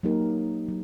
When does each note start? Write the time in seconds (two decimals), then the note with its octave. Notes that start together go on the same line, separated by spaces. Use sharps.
0.03 F#3 A#3 D#4 G4 A#4
0.69 F#3